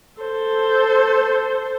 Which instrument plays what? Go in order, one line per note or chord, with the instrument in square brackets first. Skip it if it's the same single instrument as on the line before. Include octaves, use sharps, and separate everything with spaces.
[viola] A4 C5